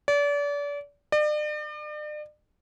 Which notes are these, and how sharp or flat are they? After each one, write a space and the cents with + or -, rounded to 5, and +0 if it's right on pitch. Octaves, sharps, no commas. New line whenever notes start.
D5 -35
D5 +40